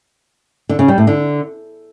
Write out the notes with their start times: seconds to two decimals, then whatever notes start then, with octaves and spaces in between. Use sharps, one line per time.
0.69 D3
0.79 C#3
0.88 G3
0.98 A2
1.07 D3